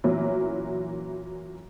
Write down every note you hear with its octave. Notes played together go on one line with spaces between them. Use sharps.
A#2 E3 F#3 A#3 C#4 E4